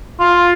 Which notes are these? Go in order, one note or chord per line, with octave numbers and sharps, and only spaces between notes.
F4